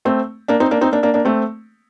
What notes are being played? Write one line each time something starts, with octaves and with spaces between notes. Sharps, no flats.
A3 C4
A#3 D4
C4 D#4
A#3 D4
C4 D#4
A#3 D4
A#3 D4
A#3 D4
A3 C4